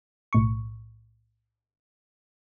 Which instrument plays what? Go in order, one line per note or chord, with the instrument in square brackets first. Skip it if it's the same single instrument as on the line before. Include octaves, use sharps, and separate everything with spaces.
[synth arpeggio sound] B1 A2 C#6